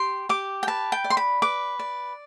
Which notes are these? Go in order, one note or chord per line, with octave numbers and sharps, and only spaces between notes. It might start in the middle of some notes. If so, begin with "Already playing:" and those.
Already playing: G4 C6
G4 D6
G5
B4 A5
G5
D5
C6
B5
B4 D6
D5